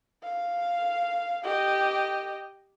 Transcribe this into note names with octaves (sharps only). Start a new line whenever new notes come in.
F5
G4 D#5